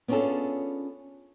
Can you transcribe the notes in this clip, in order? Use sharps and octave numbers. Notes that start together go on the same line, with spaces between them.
B3 C#4 D4 F4 G#4 A4